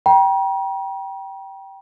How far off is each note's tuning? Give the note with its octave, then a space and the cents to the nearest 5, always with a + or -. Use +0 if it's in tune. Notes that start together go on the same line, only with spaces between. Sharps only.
G5 -10 A#5 +45